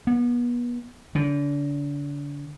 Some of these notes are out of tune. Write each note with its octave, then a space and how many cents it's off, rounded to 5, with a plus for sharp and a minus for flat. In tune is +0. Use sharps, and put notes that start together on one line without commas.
B3 -35
D3 -35